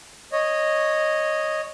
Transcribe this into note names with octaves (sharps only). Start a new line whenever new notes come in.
C#5 D#5